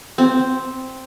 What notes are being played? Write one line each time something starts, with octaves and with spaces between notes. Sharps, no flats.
C4